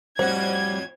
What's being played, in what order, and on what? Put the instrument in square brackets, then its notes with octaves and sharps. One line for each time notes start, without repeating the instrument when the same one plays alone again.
[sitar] F2 A2 F#4 [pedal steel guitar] G3 [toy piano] C5 [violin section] G#6